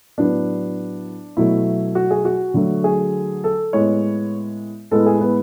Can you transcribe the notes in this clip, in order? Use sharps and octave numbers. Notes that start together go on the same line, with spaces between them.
A2 F#3 B3 D4
B2 F#3 A3 E4
F#4
G#4
F#4
D3 F#3 A3
G#4
A4
A2 G#3 B3 C#5
A2 G#3 B3 A4
G#4
B3